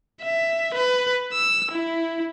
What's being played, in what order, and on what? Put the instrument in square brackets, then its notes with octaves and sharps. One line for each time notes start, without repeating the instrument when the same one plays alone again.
[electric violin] E5
B4
E6
E4